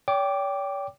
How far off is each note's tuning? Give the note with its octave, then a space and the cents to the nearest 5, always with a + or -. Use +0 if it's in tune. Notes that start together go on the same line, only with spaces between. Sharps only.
C#5 +45 G5 +0 D6 +0